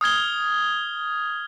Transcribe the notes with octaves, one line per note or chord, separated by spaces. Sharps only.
D#6 F6 G#6 G7